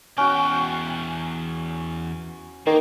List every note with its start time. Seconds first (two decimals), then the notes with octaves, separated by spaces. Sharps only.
0.18 E2 C#4 F#4 G5
2.66 D#3 A#3